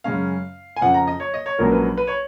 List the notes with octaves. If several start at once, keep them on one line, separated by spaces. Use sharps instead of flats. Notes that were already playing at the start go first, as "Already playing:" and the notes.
F#2 C#3 G#3 C#4 F5
G#5
F2 C#3 F3 F#5
A#5
D#5
C#5
D#5
C#5
A#1 G#2 F#3 A#3 C#4 A#4
B4
B4
C#5